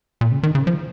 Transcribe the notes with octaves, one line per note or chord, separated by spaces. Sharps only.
A#2
C#3
D#3
C#3
F3